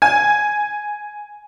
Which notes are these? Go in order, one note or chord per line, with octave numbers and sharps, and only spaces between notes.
G#5